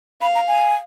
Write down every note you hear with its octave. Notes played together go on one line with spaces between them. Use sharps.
F5 B5
A#5
G#5